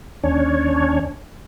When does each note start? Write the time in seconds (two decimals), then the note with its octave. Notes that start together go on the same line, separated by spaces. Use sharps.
0.23 D#2 C#4 D4 C#5